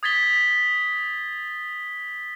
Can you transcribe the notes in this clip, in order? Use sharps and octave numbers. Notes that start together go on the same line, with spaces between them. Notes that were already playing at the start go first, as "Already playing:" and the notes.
D#6 G#6 A6 B6 G7